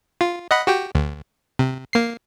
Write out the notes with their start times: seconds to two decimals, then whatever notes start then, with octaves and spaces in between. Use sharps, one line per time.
0.21 F4
0.51 D#5 F#5 B5
0.67 F#4 G4 G5
0.95 D2
1.59 C3
1.93 A#3 C7